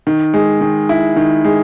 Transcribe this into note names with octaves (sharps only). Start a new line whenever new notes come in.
D#3
G#3
D#3
E4
D#3
G#3